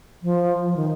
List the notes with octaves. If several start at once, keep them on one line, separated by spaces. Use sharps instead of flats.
F3
F3
D#3